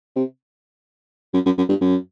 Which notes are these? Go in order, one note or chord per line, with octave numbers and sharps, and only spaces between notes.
C3
F#2
F#2
F#2
G2
F#2